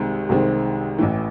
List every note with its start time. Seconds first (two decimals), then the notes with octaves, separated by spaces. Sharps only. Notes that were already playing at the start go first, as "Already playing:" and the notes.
Already playing: C2 C3 D#3 G#3 C4
0.29 C2 C3 D#3 G#3 C4
0.99 A1 A2 E3